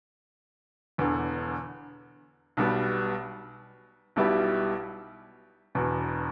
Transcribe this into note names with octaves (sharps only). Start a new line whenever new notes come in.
E1 E2 D3 B3
B1 B2 G3 B3
B1 B2 G3 E4 G4
E1 E2 B2